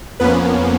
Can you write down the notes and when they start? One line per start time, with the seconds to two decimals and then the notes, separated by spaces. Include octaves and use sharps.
0.20 F2 F3 A#3 B3 C#4 B4